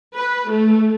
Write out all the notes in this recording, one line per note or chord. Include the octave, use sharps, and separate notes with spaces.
B4
A3